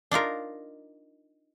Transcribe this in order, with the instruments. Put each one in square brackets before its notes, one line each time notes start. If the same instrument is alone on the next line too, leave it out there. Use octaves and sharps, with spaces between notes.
[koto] D4 D#4 F4 A#4